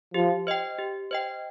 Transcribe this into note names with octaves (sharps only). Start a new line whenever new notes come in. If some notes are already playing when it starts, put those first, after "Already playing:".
F3 G4
C5 D#5 G5
G4
C5 D#5 G5